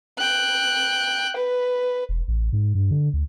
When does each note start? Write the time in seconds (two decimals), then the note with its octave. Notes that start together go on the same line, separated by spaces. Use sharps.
0.18 G5 F#6
1.36 B4
2.09 E1
2.28 A1
2.53 G#2
2.75 G2
2.91 D3
3.13 D2